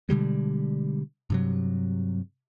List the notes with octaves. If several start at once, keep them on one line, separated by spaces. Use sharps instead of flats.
B2 D3 G3 G#3
G2 C3 F#3